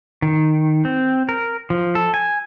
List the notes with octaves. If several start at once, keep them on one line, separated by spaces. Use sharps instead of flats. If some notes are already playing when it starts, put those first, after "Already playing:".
D#3
C4
A#4
F3
A4
G#5